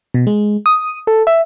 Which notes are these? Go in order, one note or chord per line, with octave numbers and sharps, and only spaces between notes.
B2
G#3
D#6
A4
E5